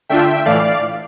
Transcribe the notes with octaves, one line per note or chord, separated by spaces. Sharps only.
D3 A3 D4 F4 E5 G5
A2 E3 A3 D5 F5